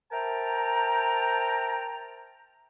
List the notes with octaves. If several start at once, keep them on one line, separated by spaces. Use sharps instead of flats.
A#4 C5 E5 G5 A5 A#5